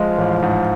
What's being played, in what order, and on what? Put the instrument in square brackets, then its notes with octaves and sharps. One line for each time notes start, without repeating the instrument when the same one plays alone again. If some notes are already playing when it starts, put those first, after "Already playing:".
Already playing: [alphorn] F3 [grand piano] G#3
[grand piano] A1
G#2